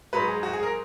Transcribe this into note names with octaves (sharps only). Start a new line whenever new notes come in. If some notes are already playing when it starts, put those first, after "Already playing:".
G#2 F#3 B4
G#4
F#4
G#4
A#4